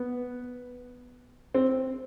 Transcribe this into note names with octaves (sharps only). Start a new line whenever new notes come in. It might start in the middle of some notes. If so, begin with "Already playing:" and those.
Already playing: B3
C4